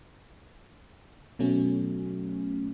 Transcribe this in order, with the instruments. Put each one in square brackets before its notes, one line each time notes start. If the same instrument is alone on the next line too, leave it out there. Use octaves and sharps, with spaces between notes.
[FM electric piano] B2 F#3 A3 C#4